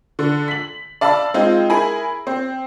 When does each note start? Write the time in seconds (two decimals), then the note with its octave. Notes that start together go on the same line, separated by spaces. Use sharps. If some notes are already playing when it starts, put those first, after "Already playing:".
0.19 D3
0.48 B6 F#7
1.01 D5 F5 A5 B5 E6
1.34 G#3 C4 D#4 F4
1.70 E4 G#4 A#4 G#5 B5
2.27 C4